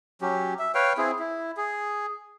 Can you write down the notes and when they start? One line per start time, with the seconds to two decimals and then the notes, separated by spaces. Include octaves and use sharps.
0.21 F#3 C#4 G4
0.59 E5
0.75 B4 C#5 F5 G5
0.98 C4 E4 G#4
1.19 E4
1.57 G#4